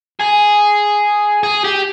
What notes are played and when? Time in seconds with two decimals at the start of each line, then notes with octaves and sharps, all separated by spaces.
0.20 G#4
1.43 G#4
1.64 G4